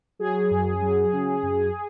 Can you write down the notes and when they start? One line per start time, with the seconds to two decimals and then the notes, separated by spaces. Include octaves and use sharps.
0.19 F#3 G#4
0.51 F#2
0.82 F#3
1.12 C#3
1.43 F#2